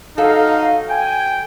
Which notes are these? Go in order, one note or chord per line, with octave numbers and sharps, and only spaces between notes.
F#3 D#4 A4 F5
G5 G#5